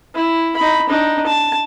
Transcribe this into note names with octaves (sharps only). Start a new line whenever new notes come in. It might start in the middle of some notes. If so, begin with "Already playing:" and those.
E4
D#4 B5
D4 D#4
A5